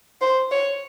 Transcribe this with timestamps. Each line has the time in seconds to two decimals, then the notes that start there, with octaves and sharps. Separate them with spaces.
0.21 C5
0.51 C#5